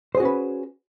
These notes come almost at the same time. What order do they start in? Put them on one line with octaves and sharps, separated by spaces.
C5 G#4 F#4 C#4 B4